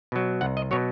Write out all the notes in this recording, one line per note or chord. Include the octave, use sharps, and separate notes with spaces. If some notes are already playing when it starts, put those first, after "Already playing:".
B2 F#3
C2 F#5
D#5
B2 F#3 C#5